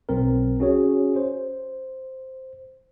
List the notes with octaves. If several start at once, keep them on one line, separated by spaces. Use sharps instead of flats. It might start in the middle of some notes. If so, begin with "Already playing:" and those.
B1 C4 A#4
C#4 F#4 G#4 C#5
C5